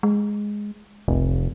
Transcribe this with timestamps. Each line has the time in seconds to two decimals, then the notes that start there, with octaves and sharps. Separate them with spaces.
0.03 G#3
1.08 F1 C2